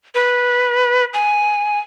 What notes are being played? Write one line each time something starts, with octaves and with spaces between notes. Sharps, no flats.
B4
G#5